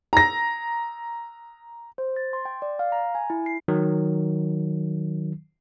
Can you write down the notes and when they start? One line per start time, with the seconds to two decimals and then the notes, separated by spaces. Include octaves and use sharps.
0.13 A#5 A#6
1.98 C5
2.16 A6
2.33 C6
2.45 G5
2.62 D5
2.79 F5
2.92 A#5
3.15 G#5
3.30 E4
3.46 C7
3.68 D#3 F#3